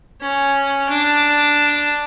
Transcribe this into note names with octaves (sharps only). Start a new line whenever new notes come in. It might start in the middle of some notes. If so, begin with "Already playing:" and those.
C#4
D4